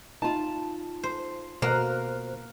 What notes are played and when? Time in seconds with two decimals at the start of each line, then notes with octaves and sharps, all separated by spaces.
0.22 D#4 F4 A5
1.03 C5
1.62 B2 A#3 C5 F6 F#6